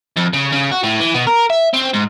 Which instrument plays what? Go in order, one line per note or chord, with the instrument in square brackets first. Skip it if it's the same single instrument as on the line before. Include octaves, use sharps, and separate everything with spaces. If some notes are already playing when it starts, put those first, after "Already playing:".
[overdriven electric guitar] F2
C#3
C#3
F#4
A2
E3
B2
A#4
E5
C4
G#2